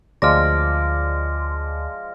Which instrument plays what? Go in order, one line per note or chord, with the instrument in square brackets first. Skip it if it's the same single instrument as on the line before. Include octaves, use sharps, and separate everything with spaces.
[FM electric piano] D2 [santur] F3 G#3 D5 [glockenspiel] F6 A#6